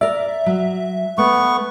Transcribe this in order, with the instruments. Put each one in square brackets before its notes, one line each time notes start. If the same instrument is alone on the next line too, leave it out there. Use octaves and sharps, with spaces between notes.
[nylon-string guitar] A#4 D5 [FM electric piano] E5
[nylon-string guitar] F#3
[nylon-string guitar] A3 [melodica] B3 C#6